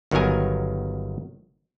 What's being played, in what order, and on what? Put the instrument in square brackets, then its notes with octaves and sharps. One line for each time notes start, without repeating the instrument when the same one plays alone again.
[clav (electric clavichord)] G1 D#3 F#3 B3 A#4 G#5